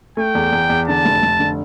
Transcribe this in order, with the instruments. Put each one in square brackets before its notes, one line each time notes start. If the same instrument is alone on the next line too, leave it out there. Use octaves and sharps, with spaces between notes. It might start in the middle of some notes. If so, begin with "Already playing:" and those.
[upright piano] A3 [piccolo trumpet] G5
[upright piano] E2
E2
E2
[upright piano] D3 [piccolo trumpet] A5
[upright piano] F1
F1
D3